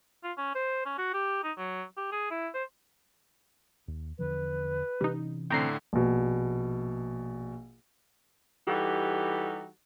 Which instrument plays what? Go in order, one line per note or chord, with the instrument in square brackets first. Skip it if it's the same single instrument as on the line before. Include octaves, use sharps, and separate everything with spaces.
[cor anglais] F4
C#4
C5
C#4
F#4
G4
D#4
F#3
G4
G#4
E4
C5
[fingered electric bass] D#2
[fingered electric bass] E2 D3 F3 [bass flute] B4
[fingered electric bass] C3 E3 C#4 [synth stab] G3 D#4
[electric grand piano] A2 D3 [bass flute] C4 [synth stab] G5 A#5 C7
[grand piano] A#1 B2
[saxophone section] E3 G3 D#4 F#4 G4 A4